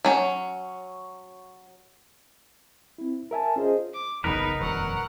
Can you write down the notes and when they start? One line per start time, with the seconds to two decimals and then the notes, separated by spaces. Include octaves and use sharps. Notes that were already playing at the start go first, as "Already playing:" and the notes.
0.05 F#3 C#4
2.98 C4 E4
3.31 A#4 E5 G#5 A5
3.56 C#4 F4 G#4 C5 D#5
3.94 D6
4.24 F#1 B1 E2 B3 D#4 A#4 B4
4.60 D#1 F2 F#3 F#5 F6